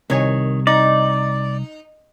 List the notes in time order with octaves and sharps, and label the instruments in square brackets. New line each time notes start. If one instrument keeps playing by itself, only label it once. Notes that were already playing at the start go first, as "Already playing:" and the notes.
[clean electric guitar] C2 [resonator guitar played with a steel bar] D#3 C#5 G#5
[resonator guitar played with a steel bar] D#4 [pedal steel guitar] D5